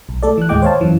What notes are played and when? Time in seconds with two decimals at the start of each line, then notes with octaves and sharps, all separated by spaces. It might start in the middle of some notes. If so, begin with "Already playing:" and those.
0.09 B1
0.23 A3 A4 D5
0.37 E3 F#6
0.49 D#2 A2 G#3 D#5 G5 D6
0.62 C5 C#5 F5 A5
0.81 F#2 E3